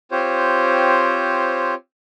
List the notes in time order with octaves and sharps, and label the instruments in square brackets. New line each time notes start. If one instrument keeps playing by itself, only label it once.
[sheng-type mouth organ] C4 F4 G4 C5 C#5